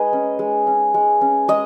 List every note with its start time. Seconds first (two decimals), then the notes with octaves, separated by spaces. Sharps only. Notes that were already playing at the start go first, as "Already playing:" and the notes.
Already playing: G#3 D#4 G#4 B4 D#5
0.13 C#4
0.39 G#3
0.67 C#4
0.94 G#3
1.21 C#4
1.48 G#3 D#5